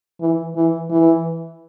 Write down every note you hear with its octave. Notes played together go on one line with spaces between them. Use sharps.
E3
E3
E3